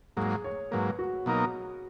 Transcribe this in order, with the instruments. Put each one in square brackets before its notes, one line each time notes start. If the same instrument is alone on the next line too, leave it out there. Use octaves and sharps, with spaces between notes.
[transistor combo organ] G#2 F#3 A#3 [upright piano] G#4
[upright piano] C#5
[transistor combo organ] G#2 F#3 A#3 [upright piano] B4
[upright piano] F#4
[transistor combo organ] B2 F#3 A#3 D#4 A#4